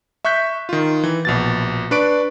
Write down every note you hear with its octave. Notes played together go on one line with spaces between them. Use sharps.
E5 C#6 F#6 G6 B6
D#3 F4
E3
A#1 B2 A6
D4 B4 D5 C#6 D7